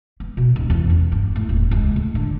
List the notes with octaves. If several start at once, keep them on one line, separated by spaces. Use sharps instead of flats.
B3
B2
D1
E2
C#4
G2
A2
D#1
C#2
A2
D3